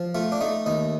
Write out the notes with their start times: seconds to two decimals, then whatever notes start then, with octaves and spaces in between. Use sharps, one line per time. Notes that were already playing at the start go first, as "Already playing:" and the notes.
Already playing: F3
0.15 A3 F4
0.32 D4
0.41 A3 D#4
0.66 D#2 D#4